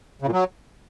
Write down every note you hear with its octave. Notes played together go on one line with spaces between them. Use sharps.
C#3
A#2
F#3